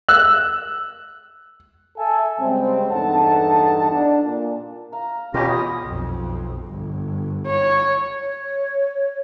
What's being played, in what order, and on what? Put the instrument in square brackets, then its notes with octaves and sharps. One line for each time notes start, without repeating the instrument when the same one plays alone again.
[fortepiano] E6 F#6
[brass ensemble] A4 E5 G#5
C#3 G3 G#3 C4
E2 G2 D#4 A4 F#5 A5
D4
A#2
[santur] F5 [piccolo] A#5
[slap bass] B2 [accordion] C#4 G4 [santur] F4 B5 [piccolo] A#6
[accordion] E2 [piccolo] D#6
[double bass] B1 F2
G1
[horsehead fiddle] C#5
[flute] C#5